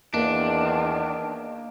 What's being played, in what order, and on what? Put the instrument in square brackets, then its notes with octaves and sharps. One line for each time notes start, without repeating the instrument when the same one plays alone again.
[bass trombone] E2 [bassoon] D#3 [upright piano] A#3 [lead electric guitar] D4